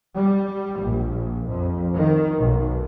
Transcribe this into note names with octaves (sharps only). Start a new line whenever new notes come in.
G3
A#1
F2
D#3
B1